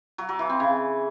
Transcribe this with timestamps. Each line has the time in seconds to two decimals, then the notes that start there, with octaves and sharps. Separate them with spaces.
0.18 F#3
0.29 F#3
0.39 E3
0.50 C4
0.60 C#3